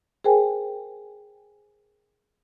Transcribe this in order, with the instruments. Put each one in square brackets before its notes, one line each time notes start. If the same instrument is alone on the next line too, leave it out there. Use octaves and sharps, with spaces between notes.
[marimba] G#4 A#4 C5 G5 G#5